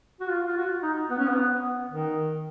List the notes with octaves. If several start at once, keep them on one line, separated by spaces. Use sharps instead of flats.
F#4
F4
F4
F#4
D#4
B3
C#4
B3
D#3